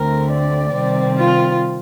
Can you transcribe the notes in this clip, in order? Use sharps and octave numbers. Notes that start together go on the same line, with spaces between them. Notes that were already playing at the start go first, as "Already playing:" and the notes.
Already playing: D2 D3 A3 C4 A#4
D5
C3 D#3 G3 C4
F4